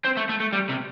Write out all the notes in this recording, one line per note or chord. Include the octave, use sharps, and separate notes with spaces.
C4
A3
A3
A3
G3
C3